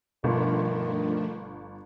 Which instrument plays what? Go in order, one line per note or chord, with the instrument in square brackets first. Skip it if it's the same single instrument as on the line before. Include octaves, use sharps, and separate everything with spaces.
[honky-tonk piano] G1 F4 [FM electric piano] B2 [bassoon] D#3 [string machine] F3 A3 D4